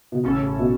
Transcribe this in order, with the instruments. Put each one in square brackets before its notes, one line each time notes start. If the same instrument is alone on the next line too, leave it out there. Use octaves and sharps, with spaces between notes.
[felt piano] B2
[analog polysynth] A1 A2 E3 C#4 A4 [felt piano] C#3
[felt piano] B2